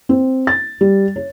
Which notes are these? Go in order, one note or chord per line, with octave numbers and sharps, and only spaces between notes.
C4
A6
G3
C#5